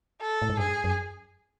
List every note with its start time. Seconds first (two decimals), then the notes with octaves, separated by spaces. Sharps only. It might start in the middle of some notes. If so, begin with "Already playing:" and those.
0.21 A4
0.42 A2
0.50 G#2
0.59 G2 G#4
0.84 F#2